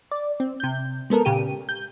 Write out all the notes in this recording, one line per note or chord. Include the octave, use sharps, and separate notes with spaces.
D5
C4
C3 G6
G#3 B3 A4 A#4
A#2 C#3 G4 D#7
G6